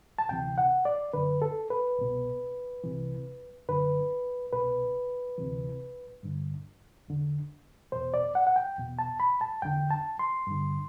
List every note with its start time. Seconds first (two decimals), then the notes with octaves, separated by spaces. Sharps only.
0.19 A5
0.29 D2 C3 E3 G5
0.58 F#5
0.85 D5
1.13 F#2 D3 B4
1.42 A4
1.70 B4
1.98 C2 B2
2.84 C2 C3 E3
3.69 F#2 D3 B4
4.53 C2 B2 B4
5.38 D2 C3 E3
6.23 G2 D3
7.08 E2 D3
7.92 E2 B2 C5
8.14 D5
8.35 F#5
8.47 F#5
8.56 G5
8.78 E2 B2
8.99 A5
9.20 B5
9.41 A5
9.62 E2 D3 G5
9.91 A5
10.19 C6
10.47 G2 D3